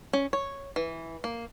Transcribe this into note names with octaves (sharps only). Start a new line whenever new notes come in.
C#4
C#5
E3
A#3